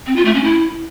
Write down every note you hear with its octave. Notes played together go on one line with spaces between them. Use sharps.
C4
F4
A3
C#4
E4